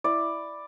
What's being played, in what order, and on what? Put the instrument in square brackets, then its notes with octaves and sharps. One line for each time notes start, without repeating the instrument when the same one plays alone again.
[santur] E4 D5